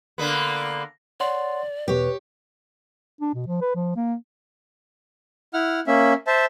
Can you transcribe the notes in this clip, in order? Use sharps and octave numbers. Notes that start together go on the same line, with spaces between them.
D3 A#3 B3
C#5 D5 F#5 C6
E2 B2 G4 B4 C#5
D4
B2
F3
B4
F3
A#3
E4 F#5 F6
A#3 C#4 E5
C5 E5 A5